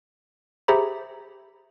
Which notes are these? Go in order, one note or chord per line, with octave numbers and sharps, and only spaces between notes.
G4 G#4 C5 E5 A#5 B5